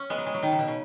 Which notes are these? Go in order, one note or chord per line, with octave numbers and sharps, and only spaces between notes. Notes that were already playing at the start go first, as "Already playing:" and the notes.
Already playing: C#4
G#3 B3
F#3
G#3
F#3
D#3
C#3
B2
C#3